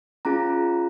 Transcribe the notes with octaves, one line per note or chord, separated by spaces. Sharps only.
C#4 F4 G#4 A#5